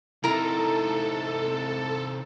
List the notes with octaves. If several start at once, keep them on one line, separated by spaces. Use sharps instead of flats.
C3 D#4 E4 A4 A#4 A#5